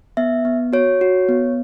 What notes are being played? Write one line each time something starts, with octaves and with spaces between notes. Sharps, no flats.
B3 E5
B3
F#4 C#5
F#4
B3